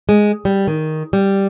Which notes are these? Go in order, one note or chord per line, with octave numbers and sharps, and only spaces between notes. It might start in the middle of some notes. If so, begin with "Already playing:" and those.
G#3
G3
D#3
G3